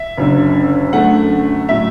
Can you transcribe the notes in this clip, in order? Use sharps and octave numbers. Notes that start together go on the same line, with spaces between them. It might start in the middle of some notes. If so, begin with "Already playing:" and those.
Already playing: E5
F#1 F#2 D3
F#2 D3 A3 F#5
A2 F#3 E5